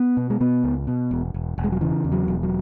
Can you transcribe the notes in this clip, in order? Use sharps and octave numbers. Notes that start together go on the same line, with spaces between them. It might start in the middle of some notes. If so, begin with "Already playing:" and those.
Already playing: B3
B2
G#3
B2 B3
C#2
B2
E1
E1
E1
G#3
F#3
C#3 E3
E2
F#3
E1
F#3